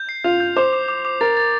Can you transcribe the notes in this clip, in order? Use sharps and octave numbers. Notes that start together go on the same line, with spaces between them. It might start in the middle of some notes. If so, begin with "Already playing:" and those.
Already playing: G6
C7
F4 F7
G6
C5 D6
D6
D6
D6
A#4 A6
A6